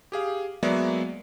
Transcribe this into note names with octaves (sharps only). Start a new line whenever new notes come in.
G4 G#4 F5
F#3 G#3 A#3 B3 D5 E5